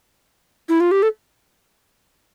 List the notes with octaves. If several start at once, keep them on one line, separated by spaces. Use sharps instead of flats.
E4
F4
G4
A4